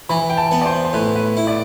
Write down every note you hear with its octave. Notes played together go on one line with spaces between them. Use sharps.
E3 B5
G5
A5
B3
D5
C5
C5
A2 B4
B4
E4
D5